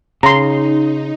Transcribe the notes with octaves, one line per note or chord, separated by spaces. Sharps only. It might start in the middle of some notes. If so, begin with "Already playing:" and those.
C#3 D#4 A#5 C6